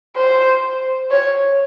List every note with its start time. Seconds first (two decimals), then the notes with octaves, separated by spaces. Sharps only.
0.16 C5
1.11 C#5